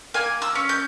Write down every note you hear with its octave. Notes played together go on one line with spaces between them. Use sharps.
A#3 G#5
E6
C#4
G6